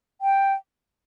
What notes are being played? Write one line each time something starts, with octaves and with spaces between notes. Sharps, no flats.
G5